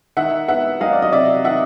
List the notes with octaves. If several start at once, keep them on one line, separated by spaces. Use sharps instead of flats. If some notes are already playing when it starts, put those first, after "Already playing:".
D#3 E5 F#5
B3 E5 F#5
F#3 D#5 F5
D5
D#5
C3 D5 E5
D#3 E5 F#5